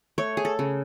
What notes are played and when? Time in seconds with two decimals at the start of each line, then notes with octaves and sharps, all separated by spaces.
0.18 A3 C#5
0.37 G#4
0.45 A4
0.59 C#3